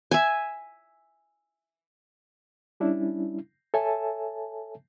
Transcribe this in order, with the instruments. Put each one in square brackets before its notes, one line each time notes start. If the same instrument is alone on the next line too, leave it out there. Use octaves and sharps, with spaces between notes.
[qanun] E5 G#5
[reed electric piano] G3 C#4 D4 E4
A4 C#5 E5 G#5 A5